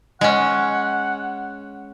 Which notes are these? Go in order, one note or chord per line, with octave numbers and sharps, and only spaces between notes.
G#3 C#4 F#5